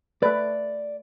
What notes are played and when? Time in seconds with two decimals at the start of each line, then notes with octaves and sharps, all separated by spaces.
0.23 A3 B4 D5